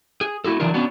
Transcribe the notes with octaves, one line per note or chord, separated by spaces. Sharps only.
G#4
A3 E4 F#4 A4
D3 E3 F#3 D4 F4 A#4
B3 C#4 D4 F#4